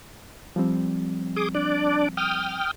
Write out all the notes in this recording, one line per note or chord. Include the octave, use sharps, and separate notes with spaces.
F3 G3 C4
G#4 D6 D#6
D4 D5
G5 D#6 F6